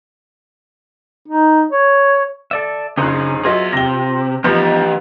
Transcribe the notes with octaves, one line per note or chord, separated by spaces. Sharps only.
D#4
C#5
A4 D5 E5
A#1 F#2 C#3 D#4 G#4 C5 F#6
F#3 F4 G#4 D#5 E5
C3 A#6 G7
E3 F3 B3 D#4 E4 G4